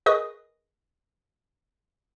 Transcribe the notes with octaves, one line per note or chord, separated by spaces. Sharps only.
G#4 A#4 B4 D#5 C#6 D#6